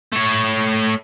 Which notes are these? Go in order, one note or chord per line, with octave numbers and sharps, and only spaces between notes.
A3 C#5